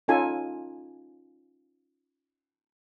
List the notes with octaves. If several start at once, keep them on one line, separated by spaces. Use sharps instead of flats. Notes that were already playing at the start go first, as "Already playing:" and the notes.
C#4 D#4 F4 A4 G#5